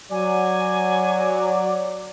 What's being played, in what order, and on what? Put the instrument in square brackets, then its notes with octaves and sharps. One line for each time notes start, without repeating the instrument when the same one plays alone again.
[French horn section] F#3 [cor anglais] D5 [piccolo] G#5